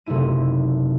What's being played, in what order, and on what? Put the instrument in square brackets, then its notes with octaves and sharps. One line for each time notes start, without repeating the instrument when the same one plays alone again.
[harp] F#1 C3 A3 D#4 E4 D#7